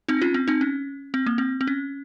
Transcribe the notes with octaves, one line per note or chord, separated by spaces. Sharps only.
C4 D#4
C#4 F4
C4
C4 D#4
C#4
C4
A#3
C4
C4
C#4